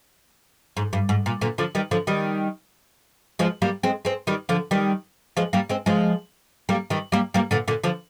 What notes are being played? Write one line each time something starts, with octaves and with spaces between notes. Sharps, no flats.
G#2
G2
G#2
A#2
A#2 D3
D3 F3
D#3 G3
D3 F3
D#3 G3
F3 G#3
G3 A#3
G#3 C4
G#3 C4
D#3 G3
D3 F3
D#3 G3
F3 G#3
G3 A#3
G#3 C4
F3 G#3
G3 A#3
D#3 G3
G3 A#3
G3 A#3
A#2 D3
A#2 D3
D3 F3